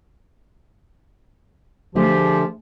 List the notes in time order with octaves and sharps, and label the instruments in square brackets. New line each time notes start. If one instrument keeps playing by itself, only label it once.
[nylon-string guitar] D3 A3 G#4 [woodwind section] F3 G4